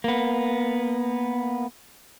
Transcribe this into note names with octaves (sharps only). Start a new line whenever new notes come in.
A#3 B3